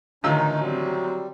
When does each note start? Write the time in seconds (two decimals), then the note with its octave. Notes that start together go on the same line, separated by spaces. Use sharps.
0.24 A1 D3 D#3 C#4 D#4 F4 E6
0.61 F#3 G3 C4